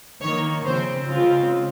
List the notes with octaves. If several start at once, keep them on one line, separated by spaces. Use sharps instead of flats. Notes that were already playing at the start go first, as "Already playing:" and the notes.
D#3 A#3 C#5
C#3 F3 C4 C5
C#3 G#3 C4 F4